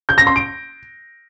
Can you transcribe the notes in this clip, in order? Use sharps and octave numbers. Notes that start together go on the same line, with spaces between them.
G6
A#6
C6
D7